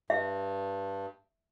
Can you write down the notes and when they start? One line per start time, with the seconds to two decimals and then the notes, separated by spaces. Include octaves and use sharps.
0.10 G2 E5